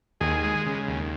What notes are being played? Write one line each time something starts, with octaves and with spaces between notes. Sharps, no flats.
D#2 G#4
G#3
C#3
D#2